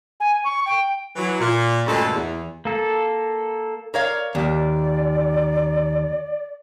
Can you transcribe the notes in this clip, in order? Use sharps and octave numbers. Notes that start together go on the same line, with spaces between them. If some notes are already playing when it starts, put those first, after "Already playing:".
G#5
C#6
G5
E3 F#3
A#2
D2 G2 A#2 C#3 G#3 A4
E2
A#3 A4
A#4 C#5 D5 F5
D#2 D5